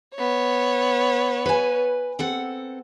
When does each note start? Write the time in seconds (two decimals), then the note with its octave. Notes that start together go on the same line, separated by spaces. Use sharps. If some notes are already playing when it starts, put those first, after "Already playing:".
0.16 B3 C#5
1.46 B4 G#5
2.19 C4 A4 F#5